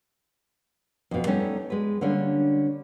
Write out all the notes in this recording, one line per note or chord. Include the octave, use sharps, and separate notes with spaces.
F2 B2
G3 A3 B3 C#4 D#4 A4
G#3 B4
D3 G3 A#3 C#4 D4